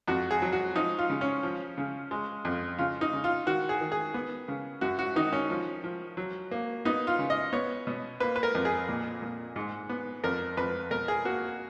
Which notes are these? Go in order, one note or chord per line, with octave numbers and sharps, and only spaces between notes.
F2 F#4
G#4
F#3
F#4
F3 D#4
F4
C#3
C#4
F3
C#3
G#3
F2
C#3 F4
D#4
C#3
F4
D#3 F#4
G#4
D#3
G#4
B3
C#3
F#2 F#4
F#4
D#3 D#4
C#4
F3
F3
F#3
A#3
B3 D#4
F4
C#3
D#5
B3 C#5
B2
A#3 B4
B4
A#4
F2
G#4
A#2
A#2
G#2
B3
F2 A#4
F2 B4
B2 A#4
G#4
A#3 F#4